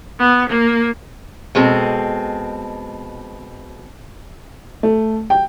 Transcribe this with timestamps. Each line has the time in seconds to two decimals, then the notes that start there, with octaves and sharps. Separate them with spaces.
0.19 B3
0.49 A#3
1.55 B2 G#3 C4 A4
4.83 A3
5.30 G5